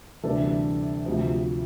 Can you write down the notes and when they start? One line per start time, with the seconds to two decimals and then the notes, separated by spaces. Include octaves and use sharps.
0.23 D2 C3 E3 G3 D4 A4
1.05 D2 C3 F3